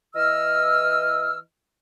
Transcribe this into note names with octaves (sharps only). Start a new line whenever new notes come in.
E3 D#5 E6 F6